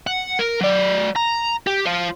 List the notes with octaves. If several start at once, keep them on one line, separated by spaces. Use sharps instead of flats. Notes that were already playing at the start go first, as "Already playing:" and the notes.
F#5
A#4
F#3 D5
A#5
G4
F4 C5